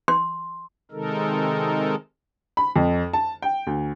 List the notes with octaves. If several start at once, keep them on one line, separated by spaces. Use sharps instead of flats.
C6
C3 D#3 G#3 D#4 A4 A#4
B5
F2
A5
G5
D2